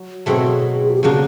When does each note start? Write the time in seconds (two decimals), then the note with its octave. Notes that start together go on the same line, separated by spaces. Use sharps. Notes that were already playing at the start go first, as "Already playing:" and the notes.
Already playing: F#3
0.26 B2 F#3 A3 C4 E4 G#4
0.88 F#4
0.95 G4
1.03 C#3 F#3 A#3 D4 G#4